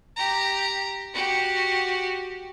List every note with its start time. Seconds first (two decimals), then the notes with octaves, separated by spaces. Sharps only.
0.16 G4 A#5
1.14 F#4 G4